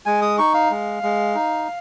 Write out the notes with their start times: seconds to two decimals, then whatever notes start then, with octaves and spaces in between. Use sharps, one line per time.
0.06 G#3 G#5
0.22 D#6
0.38 D#4 C#6
0.54 F5
0.70 G#3
1.03 G#3
1.35 D#4